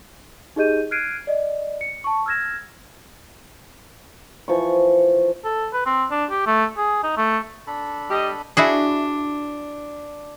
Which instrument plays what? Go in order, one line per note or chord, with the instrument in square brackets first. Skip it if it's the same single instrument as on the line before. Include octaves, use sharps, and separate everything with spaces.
[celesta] D#4 G4 G#4 D#5 G6 D#7
F6 F#6 G#6 C7 D7 D#7
D5 D#5
C#7
A5 C#6
E6 F6 G#6 A#6 E7
[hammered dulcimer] E3 F3 C#6
[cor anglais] A4
B4
C4
D4
G4
A3
G#4
D#4
A3
[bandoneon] D4 A4 B5
[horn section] G3 G4 D#5
[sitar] D4 [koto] E4 F#4 G#4